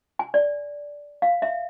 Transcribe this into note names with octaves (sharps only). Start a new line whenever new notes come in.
G#5
D5
F5
E5